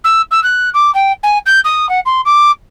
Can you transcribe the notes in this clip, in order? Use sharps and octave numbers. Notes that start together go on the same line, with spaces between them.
E6
E6
F#6
D6
G5
G#5
G6
D#6
F#5
C6
D6